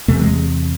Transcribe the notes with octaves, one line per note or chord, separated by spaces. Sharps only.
E2 C3 A3
G#3